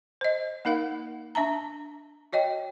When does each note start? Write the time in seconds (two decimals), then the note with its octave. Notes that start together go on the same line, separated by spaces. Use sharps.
0.21 C5 D#5
0.65 A#3 D#4 A#4 F5 F#5
1.35 D4 E5 A5 A#5
2.33 F#4 C#5 D#5 G5